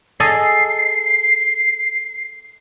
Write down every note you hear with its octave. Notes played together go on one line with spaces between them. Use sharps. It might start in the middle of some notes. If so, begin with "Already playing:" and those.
G#4 A4 D#5 C7